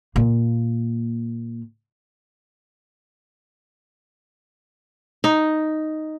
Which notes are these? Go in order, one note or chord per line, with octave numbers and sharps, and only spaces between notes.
A#2 A#3
D#4